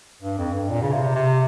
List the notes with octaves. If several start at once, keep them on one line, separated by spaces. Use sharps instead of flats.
G2
F2
G2
A#2
C#3
C3
C3